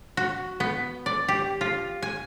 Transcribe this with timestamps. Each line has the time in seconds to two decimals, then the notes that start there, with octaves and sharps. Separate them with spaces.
0.17 F#4
0.60 B3
1.06 D5
1.28 G4
1.61 F4
2.02 G#5